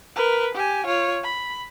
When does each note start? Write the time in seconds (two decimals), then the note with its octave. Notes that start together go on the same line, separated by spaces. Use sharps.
0.16 A#4 B4
0.55 G4 G#5
0.86 F4 C#5
1.24 B5